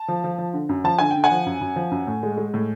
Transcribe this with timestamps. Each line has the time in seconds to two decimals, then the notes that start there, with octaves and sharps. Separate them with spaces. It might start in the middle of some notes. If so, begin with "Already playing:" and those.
Already playing: A5
0.08 F3
0.24 F3
0.38 F3
0.53 D3
0.69 F#2
0.84 F3 A5
0.99 D3 G#5
1.11 G5
1.16 D3
1.24 F#5 G#5
1.31 F3
1.46 F#2
1.61 F#2
1.76 F3
1.91 F#2
2.07 A2
2.23 G#3
2.37 G#3
2.54 A2